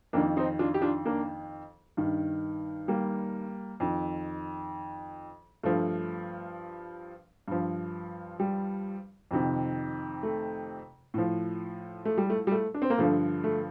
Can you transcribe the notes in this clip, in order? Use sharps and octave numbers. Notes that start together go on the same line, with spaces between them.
F2 D#3 A#3 D4
C4 D#4
D4 F4
G4
D4 F4
A#3 D4
G2 D#3
G3 A#3
F2 D#3
G2 F3 A3
G2 F3
G3
F2 C3 D#3
A3
A2 F3
A3
G3
A3
G3
A3
D4
C4
A#3
G2 D3 F3 A3
A3